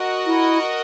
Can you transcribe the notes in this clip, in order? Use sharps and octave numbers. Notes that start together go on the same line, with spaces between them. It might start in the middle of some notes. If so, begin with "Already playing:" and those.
Already playing: F#4 A#4 D#5 F#5
E4